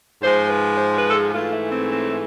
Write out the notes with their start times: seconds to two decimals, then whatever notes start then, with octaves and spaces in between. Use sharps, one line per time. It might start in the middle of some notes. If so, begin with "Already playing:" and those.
0.22 G#2 F3 G#3 C5
0.49 B4
0.77 C5
0.97 B4
1.09 A4
1.15 G#4
1.34 G#2 E3 A3 F4
1.53 E4
1.71 C4
1.91 C4